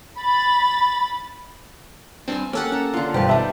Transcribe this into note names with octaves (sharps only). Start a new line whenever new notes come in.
B5 A6
G2 C4 G#5 A5
A#3 C#4 G4 A4 F#5
C#4 A5 A#5
D3 F4
G1 B2 G4 B4 C5 G5 A5
G3 D#4 E5 A5